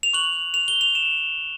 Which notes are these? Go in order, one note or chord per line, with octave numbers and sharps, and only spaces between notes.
F7
C#6 F#6 F#7
F7
G7
F7
E7